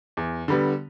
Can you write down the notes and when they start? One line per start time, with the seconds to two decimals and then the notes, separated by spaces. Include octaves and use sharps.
0.17 E2
0.48 D3 G3 B3